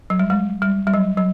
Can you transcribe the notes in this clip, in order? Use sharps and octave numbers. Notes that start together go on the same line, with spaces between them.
F#3
G3
G#3
G3
G3
F#3
F#3